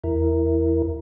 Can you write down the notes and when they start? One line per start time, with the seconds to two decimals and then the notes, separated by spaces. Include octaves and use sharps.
0.04 E2 E4 A#4